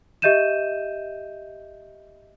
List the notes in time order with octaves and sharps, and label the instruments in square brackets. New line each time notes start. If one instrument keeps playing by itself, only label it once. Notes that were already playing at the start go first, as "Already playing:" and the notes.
[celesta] G4 D#5 E5 G6 D#7 E7